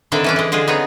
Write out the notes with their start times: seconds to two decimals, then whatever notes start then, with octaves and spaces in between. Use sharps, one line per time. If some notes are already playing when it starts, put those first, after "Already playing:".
0.12 D3 D#3 C4 D4 E4 A4
0.24 E3 C#4 D4
0.36 E3 G#3
0.52 D3 G#3 F4 G#4 C5
0.68 B3 C4 D#4 G#4 C#5